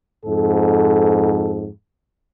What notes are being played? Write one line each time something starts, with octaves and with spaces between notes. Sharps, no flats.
F2 G#2 A4